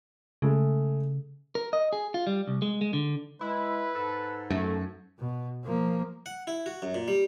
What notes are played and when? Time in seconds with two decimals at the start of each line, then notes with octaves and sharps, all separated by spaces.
0.42 C#3 G#3 A3
1.55 A#4
1.73 D#5
1.93 G#4
2.14 F4
2.27 G3
2.47 C2
2.62 G#3
2.81 G#3
2.93 D3
3.41 G#3 E4 B4
3.95 G#2 A4
4.50 F#2 A3
5.20 B2
5.64 F3 A#3
6.26 F#5
6.47 E4
6.66 F#4
6.82 F#2
6.95 A#2
7.08 G3